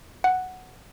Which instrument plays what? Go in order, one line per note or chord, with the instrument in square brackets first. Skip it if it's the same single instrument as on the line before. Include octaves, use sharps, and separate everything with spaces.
[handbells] F#5